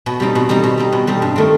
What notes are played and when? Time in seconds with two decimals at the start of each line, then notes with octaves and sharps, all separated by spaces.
0.06 B2
0.20 G3 C4 D#4
0.35 B2
0.49 G3 C4 D#4
0.64 B2
0.78 G3 C4 D#4
0.92 B2
1.07 G3 C4 D#4
1.22 G2
1.36 D#3 A3 C4